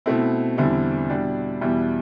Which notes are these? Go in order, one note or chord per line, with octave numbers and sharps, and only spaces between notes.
B2 A3 C4 E4
E2 D3 G3 C4 E4
B2 G3 D4
E2 B2 G3 E4